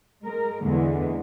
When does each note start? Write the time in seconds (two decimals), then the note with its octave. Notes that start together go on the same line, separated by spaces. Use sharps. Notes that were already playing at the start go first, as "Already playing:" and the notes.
0.24 G#3 A#4
0.63 E2 D3 G#3